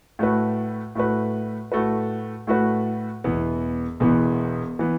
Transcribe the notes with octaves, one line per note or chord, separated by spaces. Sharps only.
A2 A3 F#4 B4
A2 A3 F#4 B4
A2 A3 F#4 B4
A2 A3 F#4 B4
E1 E2 E3 B3
E1 E2 E3 B3
E3 B3